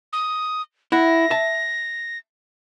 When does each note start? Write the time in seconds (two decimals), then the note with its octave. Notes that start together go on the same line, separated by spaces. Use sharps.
0.13 D#6
0.92 E4 F#5 A#6
1.30 E5 A5